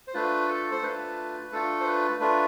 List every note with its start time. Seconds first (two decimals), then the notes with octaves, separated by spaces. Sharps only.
0.08 C5
0.14 A3 D4 F4 B4
0.48 A4
0.72 C5
0.83 A3 D4 F4 B4
1.52 A3 D4 F4 A4
1.81 C5
1.85 B4
2.20 A3 D4 F4 B4